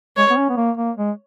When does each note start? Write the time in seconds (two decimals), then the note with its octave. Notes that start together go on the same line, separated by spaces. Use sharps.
0.17 G#3 C#5
0.30 B3
0.37 C#4
0.49 B3
0.57 A#3
0.77 A#3
0.97 G#3